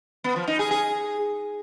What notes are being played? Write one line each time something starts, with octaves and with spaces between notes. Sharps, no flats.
B3
F3
D#4
G#4
G#4